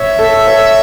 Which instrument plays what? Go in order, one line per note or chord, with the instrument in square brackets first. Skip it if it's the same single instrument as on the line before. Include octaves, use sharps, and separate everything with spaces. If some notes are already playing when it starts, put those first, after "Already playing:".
Already playing: [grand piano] C#5 [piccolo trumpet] E5
[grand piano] A4
C#5